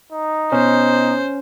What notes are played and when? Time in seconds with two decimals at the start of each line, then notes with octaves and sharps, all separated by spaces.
0.13 D#4
0.52 B2 C#4 C5